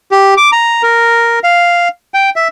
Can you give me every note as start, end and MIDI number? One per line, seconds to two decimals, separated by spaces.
0.11 0.34 67
0.37 0.51 86
0.52 0.82 82
0.83 1.39 70
1.44 1.88 77
2.14 2.30 79
2.36 2.48 76